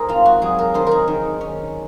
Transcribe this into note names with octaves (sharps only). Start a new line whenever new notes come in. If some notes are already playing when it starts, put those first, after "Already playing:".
Already playing: G#2 G#4 A#4 C5
C4 F4
F#4
F#3 G#4
A#4
D#3 C5
G#4 A#4
D#3
C#4